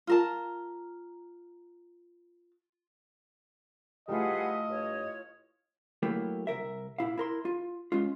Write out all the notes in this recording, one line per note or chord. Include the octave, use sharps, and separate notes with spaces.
F4 A#4 A5
G3 A3 E4 F4 G#4 B4 D#5 F#5
G2 C#5
F#3 A3 A#3 E4 G4
C2 C3 A#4 E5
A#2 E4 F5
E4 A#4 C6
F4
G#3 C#4 F4